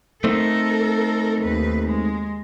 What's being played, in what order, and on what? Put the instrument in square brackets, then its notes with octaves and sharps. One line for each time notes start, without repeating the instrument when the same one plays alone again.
[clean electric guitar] A3 C4 D#4 [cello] A4 A#4
[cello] D#2 B4
G#3